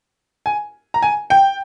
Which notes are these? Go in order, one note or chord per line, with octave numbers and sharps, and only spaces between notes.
G#5
A#5
G#5
G5